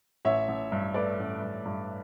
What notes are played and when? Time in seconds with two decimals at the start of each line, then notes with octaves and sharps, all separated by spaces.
0.25 A1 C#5 E5
0.48 A1
0.72 G2
0.94 A3 B4 D5
1.19 A1
1.42 G2
1.65 G2